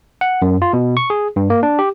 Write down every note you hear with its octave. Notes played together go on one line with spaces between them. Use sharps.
F#5
F#2
F4
B2
C#6
G#4
G2
A#3
D4
G4